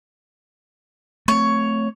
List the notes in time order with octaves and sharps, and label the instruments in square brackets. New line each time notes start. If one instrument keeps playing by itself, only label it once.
[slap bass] A3 C4 [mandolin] C#5